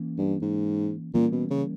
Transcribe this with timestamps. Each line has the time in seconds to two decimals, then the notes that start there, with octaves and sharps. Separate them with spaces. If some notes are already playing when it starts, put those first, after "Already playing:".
Already playing: E3 A#3 C#4
0.18 G2
0.42 G#2
1.14 A#2 E3 G3 A#3 C#4
1.32 B2
1.50 C#3